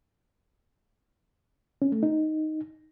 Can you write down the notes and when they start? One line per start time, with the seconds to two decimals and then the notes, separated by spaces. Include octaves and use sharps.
1.82 C#4
1.92 A3
2.03 D#4